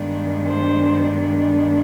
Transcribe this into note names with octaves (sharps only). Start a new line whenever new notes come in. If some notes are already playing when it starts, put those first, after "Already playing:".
Already playing: G2 D#3 G#3 B3 D4
C5